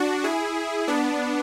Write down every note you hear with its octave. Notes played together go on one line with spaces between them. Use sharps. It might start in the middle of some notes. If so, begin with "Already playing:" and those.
Already playing: D4 F#4
E4 G#4
B3 D4